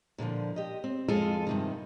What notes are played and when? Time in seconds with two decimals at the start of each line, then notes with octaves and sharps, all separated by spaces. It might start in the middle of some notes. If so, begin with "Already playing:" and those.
0.18 A#2 D3 E3 F3
0.56 G4 D#5
0.84 C4
1.08 F2 G#3 F4 A4 G#5
1.47 G2 C3 D#3